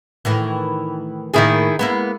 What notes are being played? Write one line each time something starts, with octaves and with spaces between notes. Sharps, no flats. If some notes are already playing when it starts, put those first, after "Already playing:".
A2 D#3 E3
A2 D#3 A#3 E4 G#4
G#3 A#3 B3 E4